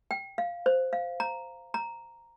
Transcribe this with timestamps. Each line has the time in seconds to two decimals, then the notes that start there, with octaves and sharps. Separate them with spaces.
0.11 G5
0.38 F5
0.66 C5
0.93 F5
1.20 A#5
1.74 A#5